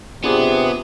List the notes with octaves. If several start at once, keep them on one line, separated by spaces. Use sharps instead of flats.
C3 B3 D4 F4 G#4 B4 D6